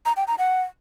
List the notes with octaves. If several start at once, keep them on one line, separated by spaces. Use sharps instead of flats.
A#5
G5
A#5
F#5